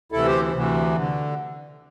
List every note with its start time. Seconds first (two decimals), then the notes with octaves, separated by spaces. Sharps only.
0.12 D2 C3 E3 E4 A4
0.26 G4 C5
0.54 D2 C3 E3
0.96 D3